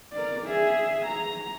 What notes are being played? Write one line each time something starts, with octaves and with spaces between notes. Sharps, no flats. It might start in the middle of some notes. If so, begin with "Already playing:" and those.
A#4 D5
G#4 E5
A#5